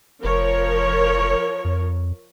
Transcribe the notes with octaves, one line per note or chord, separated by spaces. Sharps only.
F1 F3 A#4 C#5
F2